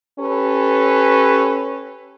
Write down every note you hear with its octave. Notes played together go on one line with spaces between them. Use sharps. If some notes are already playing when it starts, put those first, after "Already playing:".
C#4 G4 A4 B4